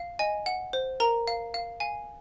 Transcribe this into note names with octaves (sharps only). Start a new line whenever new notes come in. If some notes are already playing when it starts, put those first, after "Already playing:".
Already playing: F5
D#5 G#5
F#5
C5
A#4 A#5
F5
F5
F5 G#5